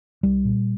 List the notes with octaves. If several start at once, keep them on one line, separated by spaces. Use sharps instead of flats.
C2 G3
A#2